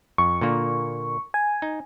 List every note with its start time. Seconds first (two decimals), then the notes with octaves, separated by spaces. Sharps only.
0.18 F2 C#6
0.41 A#2 D3 A#3
1.34 G#5
1.62 D#4